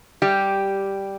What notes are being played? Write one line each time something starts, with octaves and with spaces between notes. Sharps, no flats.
G3 G4